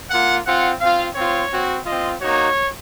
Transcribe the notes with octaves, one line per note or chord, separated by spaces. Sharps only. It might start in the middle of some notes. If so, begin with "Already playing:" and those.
A#3 F4 F#5
C4 F4 F#5
C4 F4 F5
C4 F4 C#5
C4 F#4
C4 F4 D#5
A#3 D#4 F#4 C#5